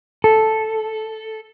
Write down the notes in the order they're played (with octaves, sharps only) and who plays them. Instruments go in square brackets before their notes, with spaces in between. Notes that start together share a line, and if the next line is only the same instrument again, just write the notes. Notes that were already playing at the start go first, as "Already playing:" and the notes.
[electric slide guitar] A4